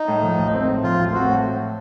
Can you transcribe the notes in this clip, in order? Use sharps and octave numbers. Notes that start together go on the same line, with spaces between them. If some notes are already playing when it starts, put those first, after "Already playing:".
Already playing: D#4
A2
F3
A1
C4
A2
F3 F4
A1
C4 F#4
A2